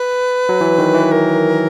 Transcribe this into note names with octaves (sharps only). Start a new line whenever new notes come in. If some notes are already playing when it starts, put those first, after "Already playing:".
Already playing: B4
F#3
E3
D#3
E3
A#4